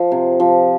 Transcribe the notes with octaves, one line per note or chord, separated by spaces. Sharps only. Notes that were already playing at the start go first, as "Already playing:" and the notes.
Already playing: F3 D#5
C3
F3